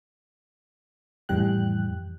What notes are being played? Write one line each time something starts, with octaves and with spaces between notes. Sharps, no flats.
F2 A2 E3 G3 G5 F#6